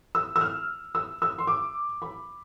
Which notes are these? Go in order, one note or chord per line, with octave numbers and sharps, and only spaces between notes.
E6
E6
F6
E6
E6
C6
D6
B5